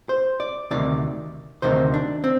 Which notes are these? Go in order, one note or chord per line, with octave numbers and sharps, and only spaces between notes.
C5
D5
D2 C3 D#3 D5
D2 C3 D#3 C5
D4
C4